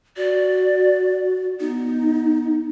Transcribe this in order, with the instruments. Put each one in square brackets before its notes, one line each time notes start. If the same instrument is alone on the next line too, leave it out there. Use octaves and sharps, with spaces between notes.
[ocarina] F#4 [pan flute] D5
[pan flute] B3 [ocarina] D#4